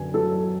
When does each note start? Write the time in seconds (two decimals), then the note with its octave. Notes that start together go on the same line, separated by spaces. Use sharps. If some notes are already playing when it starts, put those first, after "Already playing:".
Already playing: F#2 D3 G#5
0.14 F#3 A4